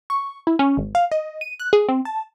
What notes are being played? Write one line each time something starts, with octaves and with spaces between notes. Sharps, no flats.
C#6
E4
C#4
G#1
F5
D#5
D#7
F#6
G#4
C4
A5